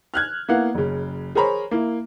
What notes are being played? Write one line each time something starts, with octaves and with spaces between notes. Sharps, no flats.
F6 F#6 G#6
A#3 B3 E4 F5 F#5
F#1 C#3
G#4 A#4 C5 C#5 A#5 B5
A#3 E4